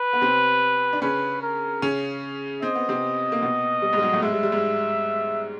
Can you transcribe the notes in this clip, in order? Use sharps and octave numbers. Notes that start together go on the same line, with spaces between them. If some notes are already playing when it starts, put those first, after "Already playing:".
Already playing: B4
B3
C3 C4
D4
C#3 C#4 B4
A#4
C#3 C#4
C4 D#5
B3
C3 C4
A#3
B2 B3
G3
G#2 G3 G#3
F#3
A2 A3
G#2 G#3 E5
G3
G3
G#2 G#3